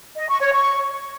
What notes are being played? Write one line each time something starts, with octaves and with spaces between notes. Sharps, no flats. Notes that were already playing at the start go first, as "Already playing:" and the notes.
D#5
C#6
C#5
C#6